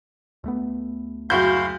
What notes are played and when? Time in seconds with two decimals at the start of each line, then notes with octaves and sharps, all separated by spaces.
0.44 D2 A3 B3
1.30 F#1 F#4 F5 B5 C6 G6